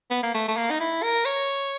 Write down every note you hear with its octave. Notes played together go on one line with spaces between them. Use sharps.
B3
A#3
A3
A3
A#3
D#4
E4
A#4
C#5